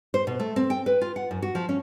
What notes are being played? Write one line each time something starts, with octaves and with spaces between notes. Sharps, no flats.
C5
B2
A3
C4
G5
B4
F4
F#5
F#2
F#4
F3
C#4